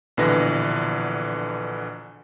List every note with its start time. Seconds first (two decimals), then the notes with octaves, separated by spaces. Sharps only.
0.17 A#1 B2 D3 E3 B4 A#6